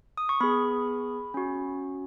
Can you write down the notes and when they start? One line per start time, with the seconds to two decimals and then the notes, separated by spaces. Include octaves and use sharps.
0.18 D#6
0.29 C#6
0.41 B3 G#4 B5
1.34 C#4 F#4